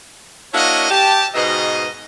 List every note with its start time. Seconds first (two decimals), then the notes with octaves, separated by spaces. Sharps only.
0.54 A#3 D4 E4 F#4 C#5 D#5
0.90 G4 A5
1.35 G#2 B2 D#5